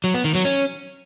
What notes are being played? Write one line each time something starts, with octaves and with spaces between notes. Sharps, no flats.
F#3
B3
D#3
F#3
C#4